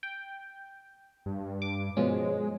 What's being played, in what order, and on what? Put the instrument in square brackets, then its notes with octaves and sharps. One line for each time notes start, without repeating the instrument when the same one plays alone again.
[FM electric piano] G5
[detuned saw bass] G2
[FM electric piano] D6
[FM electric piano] B2 F3 C#4 [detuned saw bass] G#3